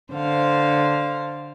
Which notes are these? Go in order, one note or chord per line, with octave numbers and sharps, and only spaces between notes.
D3 C5 F5